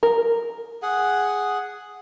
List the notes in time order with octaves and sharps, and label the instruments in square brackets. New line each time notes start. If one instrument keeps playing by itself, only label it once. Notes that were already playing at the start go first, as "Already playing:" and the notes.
[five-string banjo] A#4
[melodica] G#4 F#5